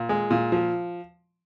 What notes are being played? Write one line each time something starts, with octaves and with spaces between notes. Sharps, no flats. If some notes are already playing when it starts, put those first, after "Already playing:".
Already playing: A#2
G#3
A#2
F3